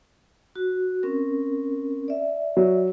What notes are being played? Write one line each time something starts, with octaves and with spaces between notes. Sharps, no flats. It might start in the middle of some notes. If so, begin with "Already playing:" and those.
F#4
C4 C#4 A#4
D5 E5
F#3